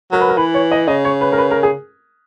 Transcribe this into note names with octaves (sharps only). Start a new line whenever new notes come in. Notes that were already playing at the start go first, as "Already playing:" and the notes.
F#3 A#4
B4
A#4
E3 B4
C#5
D#5
C#3 D#5
C#5
B4
A#4
B4
A#4
G#4